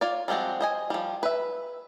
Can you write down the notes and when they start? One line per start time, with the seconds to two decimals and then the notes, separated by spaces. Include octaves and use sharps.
0.01 F4 C#5 D5
0.28 F3 G3 G#3 C4 F#4
0.61 C5 D#5 G#5
0.90 F3 G3
1.23 B4 E5